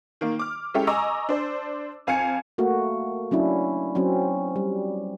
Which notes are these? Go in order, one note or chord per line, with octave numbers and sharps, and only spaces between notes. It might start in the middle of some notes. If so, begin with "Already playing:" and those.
D#3 A#3
D6 F6
G#3 C#4 E4 G4 A4
D#5 G#5 A#5 C#6 D6 E6
D4 C5 D5
F2 F5 G#5 G#6 C#7
A3 A#3 F#4
F#3 C#4 D4 E4
F#3 C4 C#4
G3